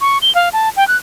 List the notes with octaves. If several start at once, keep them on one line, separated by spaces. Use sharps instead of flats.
C#6
G7
F5
A5
G5
F#6